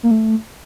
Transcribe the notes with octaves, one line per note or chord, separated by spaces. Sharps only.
A#3
A3